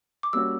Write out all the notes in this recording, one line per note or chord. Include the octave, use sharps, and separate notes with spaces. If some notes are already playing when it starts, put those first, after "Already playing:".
D6
G3 A#3 C#4 F#4 C#5 E6